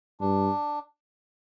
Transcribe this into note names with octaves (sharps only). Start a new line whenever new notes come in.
G2 D4